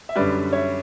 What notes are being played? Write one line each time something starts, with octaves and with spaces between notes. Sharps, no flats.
E5
F#2 D3 G3 B4 D5
C#5 E5